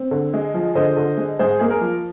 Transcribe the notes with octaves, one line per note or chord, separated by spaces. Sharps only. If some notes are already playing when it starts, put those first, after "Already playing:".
Already playing: C4
D3
G#3
F3
D3 C5 D#5
D3
G#3
G#2 G#4 C5
A#3 G#4
A#4
F3